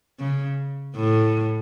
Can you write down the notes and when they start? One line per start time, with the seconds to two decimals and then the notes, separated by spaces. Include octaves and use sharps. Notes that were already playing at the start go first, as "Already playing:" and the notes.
0.20 C#3
0.96 A2